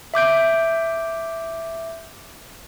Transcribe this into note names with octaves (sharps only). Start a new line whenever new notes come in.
E5 D6 G6 D7